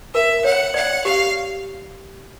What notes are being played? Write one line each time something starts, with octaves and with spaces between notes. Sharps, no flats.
A#4 E5
C#5 F#5
D5 F#5
G4 F5